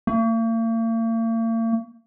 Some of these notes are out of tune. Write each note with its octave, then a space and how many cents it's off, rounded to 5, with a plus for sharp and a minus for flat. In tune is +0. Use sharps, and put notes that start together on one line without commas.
A#3 -45